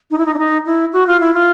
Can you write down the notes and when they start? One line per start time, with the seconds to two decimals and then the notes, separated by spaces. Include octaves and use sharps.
0.11 D#4
0.18 E4
0.26 D#4
0.34 D4
0.39 D#4
0.66 E4
0.93 F#4
1.07 F4
1.20 E4
1.34 F4